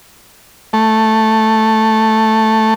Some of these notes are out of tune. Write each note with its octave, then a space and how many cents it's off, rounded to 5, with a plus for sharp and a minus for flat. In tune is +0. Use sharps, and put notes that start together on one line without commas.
A3 +0